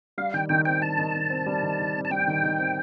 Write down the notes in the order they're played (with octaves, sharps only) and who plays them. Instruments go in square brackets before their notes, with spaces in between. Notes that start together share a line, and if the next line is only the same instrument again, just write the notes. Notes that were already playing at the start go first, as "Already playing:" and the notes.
[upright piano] G3 [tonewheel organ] F5
[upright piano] D#3 [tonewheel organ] G5
[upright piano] D#3 [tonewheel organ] G5
[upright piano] C4 [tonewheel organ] G5
[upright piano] G3 [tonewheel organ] A5
[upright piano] D#3
D#3
C4
G3
D#3
D#3
C4
[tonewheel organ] A5
[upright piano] G3 [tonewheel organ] G5
[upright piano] D#3
D#3
C4